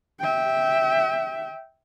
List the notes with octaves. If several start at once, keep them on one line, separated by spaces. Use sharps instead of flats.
E5 G5